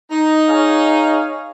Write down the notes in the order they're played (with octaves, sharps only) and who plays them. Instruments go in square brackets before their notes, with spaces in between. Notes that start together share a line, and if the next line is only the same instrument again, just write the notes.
[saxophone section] D#4
[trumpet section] G#4 C#5 F5